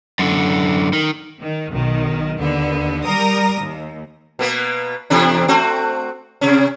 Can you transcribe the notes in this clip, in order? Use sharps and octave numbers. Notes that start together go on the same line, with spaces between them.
F#2 D3
D#3
D#3
B1 D#3
D#2 D3 B3
G3 A#4 A#5 D#6 A#6
D#2
B2 A#3 B3
E2 C3 D4
A3 C4 F#4
C3 C#4